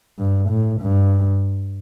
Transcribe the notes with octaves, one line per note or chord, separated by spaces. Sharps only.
G2
A2
G2